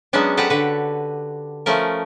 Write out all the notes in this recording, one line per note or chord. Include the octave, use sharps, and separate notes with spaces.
F#3 G#3 B3 C#4 D4
F#4 G4 A4 B4 C5 F#5
D3 B4
F3 A3 C#4 A#4